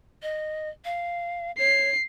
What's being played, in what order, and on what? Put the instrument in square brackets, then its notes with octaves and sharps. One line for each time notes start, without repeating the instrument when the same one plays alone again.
[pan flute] D#5
F5
[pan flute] C#5 [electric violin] C7